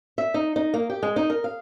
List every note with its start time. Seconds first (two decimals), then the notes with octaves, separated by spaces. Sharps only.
0.18 E5
0.34 D#4
0.56 D#4
0.74 A#3
0.90 G4
1.03 G#3
1.16 D#4
1.30 A#4
1.44 F5